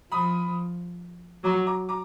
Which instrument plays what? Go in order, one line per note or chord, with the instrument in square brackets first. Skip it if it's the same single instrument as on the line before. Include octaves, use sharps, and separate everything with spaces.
[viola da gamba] F3 [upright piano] B5 D#6
[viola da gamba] F#3 [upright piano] A#5 D6
[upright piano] A#5 D6
A#5 D6